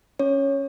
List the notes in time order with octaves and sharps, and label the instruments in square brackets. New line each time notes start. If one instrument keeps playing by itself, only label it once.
[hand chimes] C#4 C#5